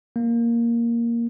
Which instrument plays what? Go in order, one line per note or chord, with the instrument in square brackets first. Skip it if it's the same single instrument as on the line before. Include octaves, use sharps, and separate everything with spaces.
[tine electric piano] A#3